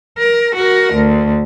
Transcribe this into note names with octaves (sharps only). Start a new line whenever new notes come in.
A#4
F#4 A#4
D2